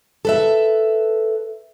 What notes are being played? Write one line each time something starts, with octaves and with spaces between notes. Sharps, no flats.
A4 B4 E5